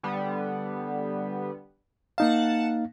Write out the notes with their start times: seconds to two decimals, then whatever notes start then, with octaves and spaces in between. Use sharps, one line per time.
0.03 D3 G3 B3
2.18 A#3 D#4 F5 F#5 A5